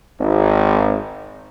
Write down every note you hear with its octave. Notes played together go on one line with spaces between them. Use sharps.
G#1